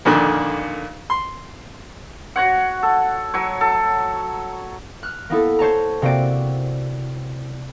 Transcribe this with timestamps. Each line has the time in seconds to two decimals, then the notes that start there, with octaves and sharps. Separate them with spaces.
0.05 F2 A#2 D3 D#3
1.10 C6
2.36 F#4 C#5 F#5
2.83 A4
3.34 F#3 C#5
3.61 A4
5.03 F6 F#6
5.30 A#3 B3 E4 A4
5.59 C5 C#5 A5 A#5
6.02 C3 A#3 C4 F#4 D5 D7